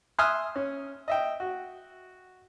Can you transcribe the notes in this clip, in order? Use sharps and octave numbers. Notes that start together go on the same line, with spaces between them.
E5 G#5 C6 D#6 F6 F#6
C#4
D#5 E5 G5
F#4